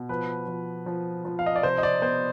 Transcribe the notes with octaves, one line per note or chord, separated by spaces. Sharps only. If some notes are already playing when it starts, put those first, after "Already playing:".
Already playing: B2
F3 B4
F3
F3
F3
F5
D#5
D5
C3 C5
D#5
D5
B3 C5